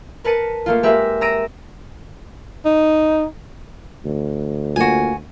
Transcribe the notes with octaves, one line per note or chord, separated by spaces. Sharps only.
A#4 B4 A5 C#7 D#7
A3 A#3 F4
G#3 G4 A#4 B4 E5
A#5 E6 A#6 D7 D#7
D#4
D2
A#3 F4 F#4 G#5